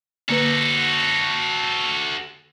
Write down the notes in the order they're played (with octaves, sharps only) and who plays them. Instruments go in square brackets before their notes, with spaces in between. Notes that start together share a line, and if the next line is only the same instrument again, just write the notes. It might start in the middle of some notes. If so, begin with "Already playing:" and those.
[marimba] D3 A#3 B4 [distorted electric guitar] F#4 A4